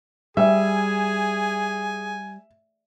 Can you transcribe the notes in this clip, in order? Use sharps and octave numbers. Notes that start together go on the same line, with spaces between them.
G3 G#4 E5 G#5